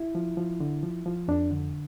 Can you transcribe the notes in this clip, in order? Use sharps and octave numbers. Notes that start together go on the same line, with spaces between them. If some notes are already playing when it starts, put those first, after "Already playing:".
Already playing: E4
F3
F3
D3
F3
F3
F2 D4
D3